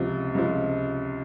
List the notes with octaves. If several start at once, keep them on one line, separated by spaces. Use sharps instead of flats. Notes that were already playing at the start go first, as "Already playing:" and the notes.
Already playing: C#2 C3 F3
C#2 C3 F3